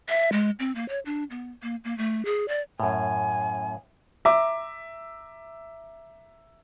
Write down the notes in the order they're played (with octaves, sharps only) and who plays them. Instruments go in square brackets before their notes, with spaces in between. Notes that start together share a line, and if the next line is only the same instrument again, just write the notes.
[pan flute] E5
G#3
C4
A#3
C#5
D4
B3
A#3
A#3
A3
G#4
D5
[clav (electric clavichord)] F#2 A2 [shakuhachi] G#5
[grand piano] E5 A#5 D6